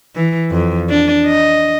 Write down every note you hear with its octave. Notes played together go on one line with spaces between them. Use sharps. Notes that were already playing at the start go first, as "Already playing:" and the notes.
E3
F2
D4
D#5